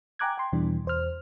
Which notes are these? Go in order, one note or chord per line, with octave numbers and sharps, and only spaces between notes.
G5 G#5 A#5 D6 F#6 G#6
G5 C6
E2 B2 E3 G3 D4
E2 C5 F6